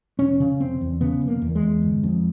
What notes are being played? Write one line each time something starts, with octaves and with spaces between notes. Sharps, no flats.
F1 C#4
C#3
F1 C4
E2
C#3 B3
F1
A#3
E2
G#3
E2
G1
F2